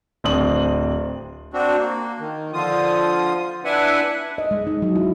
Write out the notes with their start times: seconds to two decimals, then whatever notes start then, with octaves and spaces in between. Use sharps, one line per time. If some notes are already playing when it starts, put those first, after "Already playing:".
0.24 D1 C4 D4 D#6 F#7
1.54 C4 D4 F#4
1.78 A#3
2.19 D#3
2.53 D3 F3 F4 D#6
3.65 D4 E4 B4 E5 F#5 G#5
4.38 D#5
4.51 G#3
4.67 D#4
4.82 F#3
4.95 E4